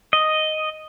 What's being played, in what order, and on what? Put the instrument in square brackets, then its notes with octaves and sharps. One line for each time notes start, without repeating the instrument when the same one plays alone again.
[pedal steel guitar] D#5